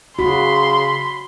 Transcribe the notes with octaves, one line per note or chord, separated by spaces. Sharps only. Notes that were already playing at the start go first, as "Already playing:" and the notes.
C#3 F#4 B5 C6